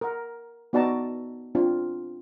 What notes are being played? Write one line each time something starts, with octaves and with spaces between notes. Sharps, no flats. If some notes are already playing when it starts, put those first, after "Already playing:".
A#4 F#5
B3 D#4 F#4 D5 A5 A#5
C4 D4 F4